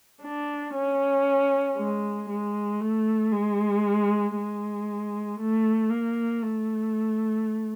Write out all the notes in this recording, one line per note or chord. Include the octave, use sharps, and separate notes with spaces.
D4
C#4
G#3
G#3
A3
G#3
G#3
A3
A#3
A3